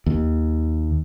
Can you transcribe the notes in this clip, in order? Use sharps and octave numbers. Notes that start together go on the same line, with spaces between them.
D#2